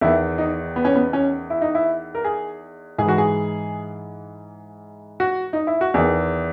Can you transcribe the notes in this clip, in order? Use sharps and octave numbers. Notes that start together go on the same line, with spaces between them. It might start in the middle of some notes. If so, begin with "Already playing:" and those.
E2 D#3 E4
D#4
B3
C#4
B3
C#4
E4
D#4
E4
A#4
G#4
G#2 E3 G#4
F#4
G#4
F#4
D#4
E4
F#4
E2 D#3 G#4